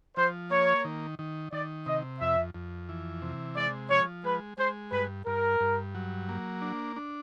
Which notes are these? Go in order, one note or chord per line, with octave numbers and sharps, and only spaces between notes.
F3 C5
A#3 C#5
D#3
D#3
D#3 D5
C3 D#5
F2 E5
F2
E3
C3
G#3 D5
F3 C#5
G#3 B4
G#3 C5
G2 B4
G2 A#4
G2
F#3
A#3
D4
D4